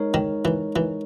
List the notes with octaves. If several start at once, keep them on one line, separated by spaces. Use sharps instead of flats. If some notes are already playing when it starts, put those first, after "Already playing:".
Already playing: G#3 D#4 A#4 C#5
D#3
E3
E3